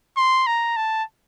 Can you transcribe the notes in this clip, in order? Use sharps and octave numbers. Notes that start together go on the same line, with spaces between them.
C6
A#5
A5